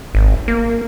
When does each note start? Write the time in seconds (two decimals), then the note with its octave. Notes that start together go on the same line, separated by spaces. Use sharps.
0.15 G#1
0.48 A#3